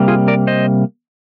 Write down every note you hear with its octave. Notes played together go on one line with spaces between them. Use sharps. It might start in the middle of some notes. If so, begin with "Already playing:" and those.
Already playing: C3 G3 A#3
F4 G#4
A#4 D5
C5 D#5